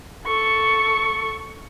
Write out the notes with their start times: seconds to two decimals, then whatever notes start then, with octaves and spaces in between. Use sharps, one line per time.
0.25 A4 C#6